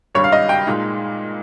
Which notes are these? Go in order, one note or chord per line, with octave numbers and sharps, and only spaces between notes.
G#1 G2 G3 C#5
F5
D#5
G5
A#2 G#3 D#4